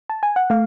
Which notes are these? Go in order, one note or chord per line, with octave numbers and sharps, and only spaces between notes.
A5
G#5
F#5
A3 F5